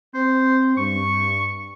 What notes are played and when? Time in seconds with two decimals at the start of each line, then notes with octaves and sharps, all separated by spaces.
0.15 C4 C5
0.77 G2 C#6